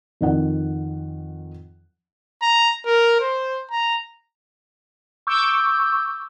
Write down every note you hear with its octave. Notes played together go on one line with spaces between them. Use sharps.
F2 D#3 F#5
A#5
A#4
C5
A#5
C#6 D6 E6 G6